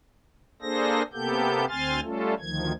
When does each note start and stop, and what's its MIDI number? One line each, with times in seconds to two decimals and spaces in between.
0.62 1.03 58
0.62 1.03 62
0.62 1.03 68
0.62 1.03 69
0.62 1.03 72
0.62 1.03 94
1.13 1.65 48
1.13 1.65 58
1.13 1.65 59
1.13 1.65 67
1.13 1.65 69
1.13 1.65 91
1.69 2.00 38
1.69 2.00 60
1.69 2.00 80
1.69 2.00 84
1.69 2.00 89
1.69 2.00 93
2.03 2.34 55
2.03 2.34 57
2.03 2.34 61
2.03 2.34 65
2.03 2.34 69
2.40 2.72 38
2.40 2.72 51
2.40 2.72 53
2.40 2.72 92